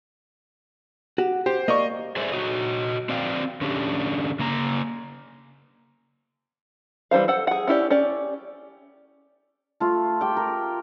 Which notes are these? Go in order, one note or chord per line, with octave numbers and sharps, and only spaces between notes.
F#4 G4
G4 C5
A#3 D5 D#5 C#6
G#4 C5 D5 E5
F#4 C#5 D#5
C4 D5 F5 G5
D3 C#4 D4 G4
C#3 A#3 A#5
E3 G3 E4 C5 F5
A4 C5 F#5
G#4 F#5
C#4 E4 G4 D5
C#4 G4 D5
A3 F4
G4 G5
A#4